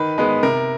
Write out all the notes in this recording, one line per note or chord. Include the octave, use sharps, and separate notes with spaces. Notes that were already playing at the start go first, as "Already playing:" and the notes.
Already playing: D#3 B4
G#3 B3
C3 A#4